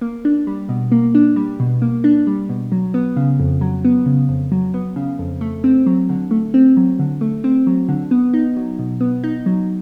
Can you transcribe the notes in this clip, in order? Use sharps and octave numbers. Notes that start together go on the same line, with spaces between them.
A#3
D4
G3
B2
A#3
D4
G3
B2
A#3
D4
G3
B2
F#3
B3
C#3
F2
F#3
B3
C#3
F2
F#3
B3
C#3
F2
A3
C4
F#3
D3
A3
C4
F#3
D3
A3
C4
F#3
D3
B3
D#4
F#3
B2
B3
D#4
F#3